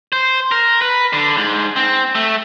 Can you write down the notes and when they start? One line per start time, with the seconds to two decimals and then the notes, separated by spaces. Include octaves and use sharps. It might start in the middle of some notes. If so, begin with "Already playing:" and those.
0.13 C5
0.52 A#4
0.82 B4
1.13 D3
1.37 G#2
1.76 C4
2.15 A3